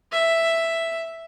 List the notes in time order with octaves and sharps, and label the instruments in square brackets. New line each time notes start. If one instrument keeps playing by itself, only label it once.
[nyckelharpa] E5